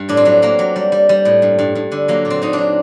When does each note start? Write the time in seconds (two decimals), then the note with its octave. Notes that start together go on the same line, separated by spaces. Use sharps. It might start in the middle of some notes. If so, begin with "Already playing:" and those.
Already playing: G2
0.09 A2 D4
0.17 C4
0.25 F#3 D4
0.42 F#3 A#3
0.59 F#3
0.76 G3
0.92 G3
1.09 G3
1.25 A2
1.42 G2
1.59 G2
1.75 G2
1.92 D3
2.08 F#3 A#3
2.25 A#2
2.30 C4
2.42 A#2 D#4
2.53 D4
2.58 F#3